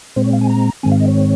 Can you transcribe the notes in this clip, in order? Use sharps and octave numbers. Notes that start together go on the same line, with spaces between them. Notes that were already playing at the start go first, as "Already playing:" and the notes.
A#2 G#3 C4 C5
C#5
F5
G#5
A#5
G#2 D#3 G#3 C4 G#5
F5
D#5
C#5